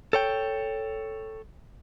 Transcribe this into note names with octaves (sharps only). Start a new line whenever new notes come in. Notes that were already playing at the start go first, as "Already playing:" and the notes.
A4 C#5 G5